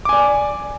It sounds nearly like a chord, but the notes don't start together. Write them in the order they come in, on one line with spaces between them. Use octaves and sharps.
D6 G#5 D5